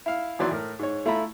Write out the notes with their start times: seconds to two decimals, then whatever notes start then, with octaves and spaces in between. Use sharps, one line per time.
0.06 E4 F5
0.39 G#1 E3 F#3 D5 C6
0.51 A2 A#4
0.79 G#2 C#5
1.06 A3 E4 F4 A#5 B5